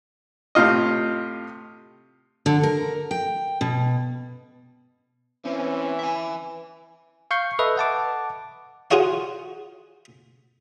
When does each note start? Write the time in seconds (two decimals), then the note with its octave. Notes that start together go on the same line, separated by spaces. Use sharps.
0.55 A2 C3 F4 D#5
2.46 D3
2.63 A#4
3.11 G5
3.61 B2
5.45 E3 C4 C#4
5.99 E5 G#5
7.31 F5 C#6 G6 C7
7.59 A4 B4 D#5 E5
7.77 F#5 A5 D6
8.91 F4 F#4 G#4 C#5 F5